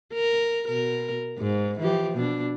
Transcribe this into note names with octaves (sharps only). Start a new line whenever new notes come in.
A#4
B2 A#4
G#2
E3 F3 G4
B2 D4